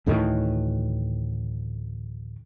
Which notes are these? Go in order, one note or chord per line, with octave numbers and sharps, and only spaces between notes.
D2 A2 D#3 E3